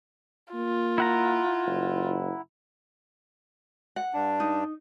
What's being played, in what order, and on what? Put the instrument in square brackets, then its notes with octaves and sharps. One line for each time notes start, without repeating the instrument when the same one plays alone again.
[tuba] A#3 [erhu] F4
[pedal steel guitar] E4 F#5 A#5
[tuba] F#1
[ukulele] F#5
[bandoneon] G2 D4
[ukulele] D#4